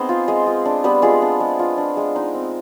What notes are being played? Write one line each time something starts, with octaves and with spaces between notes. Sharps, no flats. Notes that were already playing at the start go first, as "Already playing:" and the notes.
Already playing: B3 C4 D#4 G#4 C5
F4
G#3
F4
D4
G3 B3 B4
G#3 F4 G#4
D4
G#3
F4
D4
G#3
D#4
C4